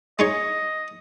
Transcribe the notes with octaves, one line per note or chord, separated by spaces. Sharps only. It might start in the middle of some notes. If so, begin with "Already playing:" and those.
G#3 D#4 C#5 D#5